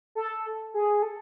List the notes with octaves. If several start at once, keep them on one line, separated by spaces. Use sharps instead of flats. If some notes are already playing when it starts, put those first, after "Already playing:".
A4
G#4
A4